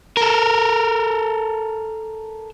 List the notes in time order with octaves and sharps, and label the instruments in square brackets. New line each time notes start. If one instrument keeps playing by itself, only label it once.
[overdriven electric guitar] A4 A#4